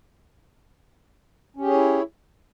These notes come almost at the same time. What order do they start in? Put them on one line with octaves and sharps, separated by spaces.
C#4 G4 G#4 C#5 E4